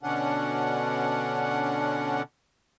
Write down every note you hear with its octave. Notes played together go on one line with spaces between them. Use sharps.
B2 D3 C#4 D4 F#5